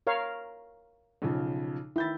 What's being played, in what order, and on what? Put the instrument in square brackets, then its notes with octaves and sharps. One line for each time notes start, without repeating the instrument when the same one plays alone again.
[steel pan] A#4 C#5 F5
[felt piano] B1 C#3 F3
[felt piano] D#3 G6 A6 [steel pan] E4